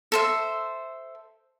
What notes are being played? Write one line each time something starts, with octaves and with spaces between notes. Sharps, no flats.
A4 C5 E5